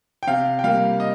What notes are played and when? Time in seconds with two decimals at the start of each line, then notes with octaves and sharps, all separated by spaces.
0.23 G5
0.27 C3 F5
0.59 G5
0.64 G3 A#3 F5
1.00 D#5